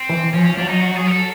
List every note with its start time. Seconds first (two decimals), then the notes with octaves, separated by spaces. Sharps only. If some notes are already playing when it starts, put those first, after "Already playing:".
Already playing: C4
0.09 E3
0.33 F3 C#4
0.45 C#4
0.57 F#3 D4
0.68 D#4
0.80 F#4
0.96 G#4
1.07 A#4
1.11 A4